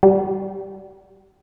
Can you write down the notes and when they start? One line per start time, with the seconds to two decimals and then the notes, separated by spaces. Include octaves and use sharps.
0.03 G3